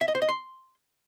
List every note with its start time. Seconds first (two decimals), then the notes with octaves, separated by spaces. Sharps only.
0.01 E5
0.08 D#5
0.15 C5
0.22 D#5
0.29 C6